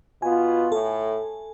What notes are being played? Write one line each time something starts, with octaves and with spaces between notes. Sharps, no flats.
B2 B3 F4 G#5
A2 A4